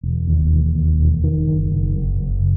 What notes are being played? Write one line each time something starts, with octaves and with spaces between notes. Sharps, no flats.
E1
D#2
E1
D#2
E1
D#3
F#1
F#1
F#1
F#1